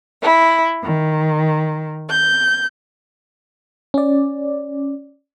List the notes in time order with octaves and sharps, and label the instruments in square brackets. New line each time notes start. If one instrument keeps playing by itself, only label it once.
[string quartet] E4
D#3
G6
[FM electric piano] C#4 D5